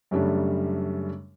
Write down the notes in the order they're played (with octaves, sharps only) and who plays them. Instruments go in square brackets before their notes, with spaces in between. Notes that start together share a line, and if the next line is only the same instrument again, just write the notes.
[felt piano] F#2 C#3 G3 A3 D4